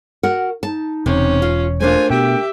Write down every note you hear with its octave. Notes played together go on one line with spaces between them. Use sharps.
F#4 A#4 F#5
D#4 A5
E1 C3 C#4
F4
A3 A#3 D4 F4 C5 G#5
B2 G4 E5 G5